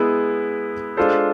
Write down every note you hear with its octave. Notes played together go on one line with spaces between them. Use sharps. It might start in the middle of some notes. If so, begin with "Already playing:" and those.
Already playing: G#3 B3 E4 G#4
G#3 D4 F4 A4 C5